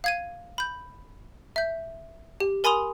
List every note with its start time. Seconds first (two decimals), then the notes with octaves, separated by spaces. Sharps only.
0.04 F5 G#6 D#7
0.58 B5 G6
1.56 E5 G6
2.40 G4
2.64 A#4 G#5 B5 C6 D#6 F7